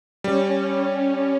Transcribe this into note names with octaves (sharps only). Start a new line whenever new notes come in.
G3 C#4